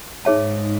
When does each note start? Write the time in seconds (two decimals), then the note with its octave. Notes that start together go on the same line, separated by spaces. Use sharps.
0.24 G#2 D#4 G#4 C#5 E5 A5